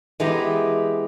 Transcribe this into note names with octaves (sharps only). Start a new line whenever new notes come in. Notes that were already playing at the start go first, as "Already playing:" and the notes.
E3 G#3 B3 G4 A#5